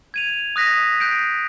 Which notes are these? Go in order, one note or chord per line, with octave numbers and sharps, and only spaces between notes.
G#6 D#7 F7
D#6 F#6 A#6 B6 D#7
F#6 G6 C7 D7 D#7